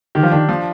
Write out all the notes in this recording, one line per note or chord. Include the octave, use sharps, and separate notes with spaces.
D#3 G4
F3
D#3 D4
F3